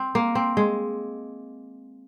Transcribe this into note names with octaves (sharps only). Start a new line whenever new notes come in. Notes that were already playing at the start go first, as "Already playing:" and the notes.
Already playing: C4
A#3
C4
G#3